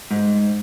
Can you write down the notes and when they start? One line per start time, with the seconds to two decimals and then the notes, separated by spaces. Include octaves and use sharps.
0.11 G#2